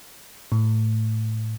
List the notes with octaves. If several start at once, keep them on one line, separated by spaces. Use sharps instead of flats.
A2